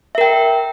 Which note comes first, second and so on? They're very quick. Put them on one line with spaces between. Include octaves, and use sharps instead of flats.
E5 A#4 G5